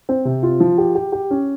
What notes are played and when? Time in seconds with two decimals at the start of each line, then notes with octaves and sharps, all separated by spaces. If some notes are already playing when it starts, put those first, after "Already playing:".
0.09 C4
0.25 C3
0.43 F4
0.60 F3
0.78 G4
0.95 G4
1.12 G4
1.31 C#4